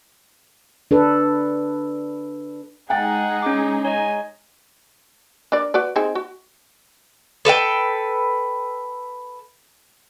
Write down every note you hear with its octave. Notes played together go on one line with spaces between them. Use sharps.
D4 A4 B4
G#3 D#4 G#4 F#5 G5 A6
C#4 D6
C#5 D#5 G#5
D4 A#4 D5
F#4 B4 D5
C4 D#4 G#4
F#4
A4 B4 E5 G5